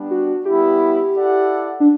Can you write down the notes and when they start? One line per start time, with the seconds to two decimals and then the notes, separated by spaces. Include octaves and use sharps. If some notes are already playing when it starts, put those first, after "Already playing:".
Already playing: G3 B3 D4
0.11 F#4
0.45 G3 B3 E4 G4
1.16 E4 A4 D5 F#5
1.80 D4